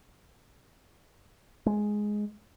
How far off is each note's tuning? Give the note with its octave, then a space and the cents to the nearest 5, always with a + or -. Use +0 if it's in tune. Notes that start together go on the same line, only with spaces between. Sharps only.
G#3 +5